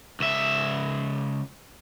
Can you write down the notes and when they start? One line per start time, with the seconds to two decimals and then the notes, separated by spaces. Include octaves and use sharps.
0.20 C#2 E5